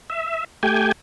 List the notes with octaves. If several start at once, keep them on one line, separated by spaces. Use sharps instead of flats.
E5
A3 G4 G5 G#5